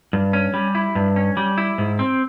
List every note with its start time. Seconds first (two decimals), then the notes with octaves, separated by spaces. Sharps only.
0.13 G2
0.33 C#4
0.54 G3
0.75 E4
0.95 G2
1.16 C#4
1.37 G3
1.58 E4
1.78 G#2
1.99 C4